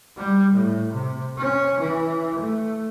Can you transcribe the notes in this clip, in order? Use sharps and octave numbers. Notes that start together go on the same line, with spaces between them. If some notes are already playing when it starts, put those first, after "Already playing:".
G3
A2
C3
C#4
E3
A3